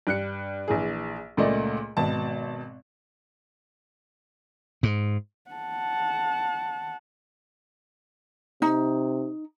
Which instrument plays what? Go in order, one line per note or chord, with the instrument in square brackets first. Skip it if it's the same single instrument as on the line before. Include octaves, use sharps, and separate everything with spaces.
[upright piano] G2 F#6 C#7
A#1 E3 G#4
C#2 A#2 A3 D5 D#5
G#1 B2 A5
[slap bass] G#2
[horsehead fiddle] F#5 A5
[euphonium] C3 [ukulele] D#4